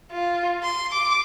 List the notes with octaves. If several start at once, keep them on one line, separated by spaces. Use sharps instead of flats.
F4
C6
D6